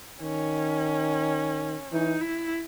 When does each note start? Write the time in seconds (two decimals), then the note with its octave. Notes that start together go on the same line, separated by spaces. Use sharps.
0.21 D#3 C#4
1.92 E3 D#4
2.21 E4